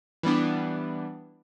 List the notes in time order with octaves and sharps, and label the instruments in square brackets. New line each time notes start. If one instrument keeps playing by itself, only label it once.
[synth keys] E3 G3 B3 D4